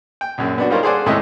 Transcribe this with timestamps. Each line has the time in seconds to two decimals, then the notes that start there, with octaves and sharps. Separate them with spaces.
0.21 G5
0.38 A#1 F#2
0.58 B3 D4 F#4
0.70 G3 D#4 F4 A#4 C5 C#5
0.83 G#4 A4 C5 D5 F#5 G#5
1.06 D#2 A2 C3 G#3 D#5 E5